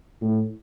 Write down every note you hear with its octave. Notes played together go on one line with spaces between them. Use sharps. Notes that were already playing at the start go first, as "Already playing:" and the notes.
A2